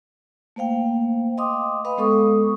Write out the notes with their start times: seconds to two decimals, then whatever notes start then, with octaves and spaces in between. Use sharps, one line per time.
0.56 A3 A#3 C5 F5 G5
1.38 D#5 F5 G5 C6 D6 D#6
1.85 B4 D#5 F5 B5
1.98 G#3 B3 A4 C#6 D#6